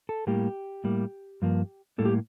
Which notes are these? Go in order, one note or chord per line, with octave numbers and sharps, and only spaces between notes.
A4
A2 G3 A#3 G4
A2 G3 A#3
G2 F3 A#3
A2 G3 A#3 A4
G4